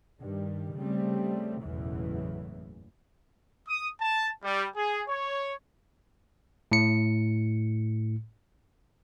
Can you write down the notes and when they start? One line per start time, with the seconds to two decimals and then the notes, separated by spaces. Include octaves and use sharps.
0.20 G2 D#3 G3
0.75 C#3 G3 A3 C4
1.62 F#1 B1 E2 A2 C#3 E3
3.68 D#6
4.01 A5
4.44 G3
4.76 G#4
5.08 C#5
6.72 A2 C#7